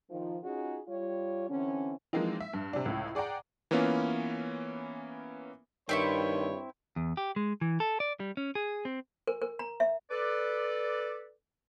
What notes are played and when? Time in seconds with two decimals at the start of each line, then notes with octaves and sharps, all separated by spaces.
0.10 D#3 F3
0.44 C#4 D#4 F4 F#4 G#4
0.88 G3 F4 C#5
1.49 D3 E3 C4 C#4
2.13 E3 F3 G#3 A#3 C4 D#4
2.40 E5
2.53 G2
2.73 C3 D4
2.86 C#2 A2
3.15 G#4 D5 F#5 G5 A#5
3.71 E3 A#3 B3 C#4 F4
5.89 G2 D#3 C4 E4 C#5 C#6
6.96 E2
7.17 G4
7.36 G#3
7.61 E3
7.80 A4
8.00 D5
8.20 G3
8.37 C#4
8.55 G#4
8.85 C4
9.27 A#4
9.42 A#4
9.59 A#5
9.80 E5
10.10 A4 B4 D5